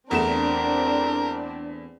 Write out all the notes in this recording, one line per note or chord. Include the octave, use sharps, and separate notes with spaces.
E2 A3 C4 D4 A#4 E7